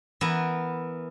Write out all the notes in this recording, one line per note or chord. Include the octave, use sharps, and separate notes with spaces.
E3 B3 E4 A#4